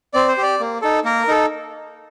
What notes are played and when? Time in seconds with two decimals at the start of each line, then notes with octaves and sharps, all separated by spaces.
0.14 C4 D5
0.28 C5
0.37 G4
0.43 D5
0.60 A#3
0.82 D#4 A4
1.05 A#3 A#4
1.28 D#4 A4